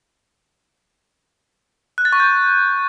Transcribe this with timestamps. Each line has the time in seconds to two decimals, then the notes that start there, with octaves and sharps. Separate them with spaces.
1.98 F#6
2.05 A6
2.13 C#6
2.20 G6